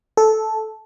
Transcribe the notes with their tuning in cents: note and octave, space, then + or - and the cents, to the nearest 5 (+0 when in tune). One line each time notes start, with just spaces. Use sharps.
A4 -10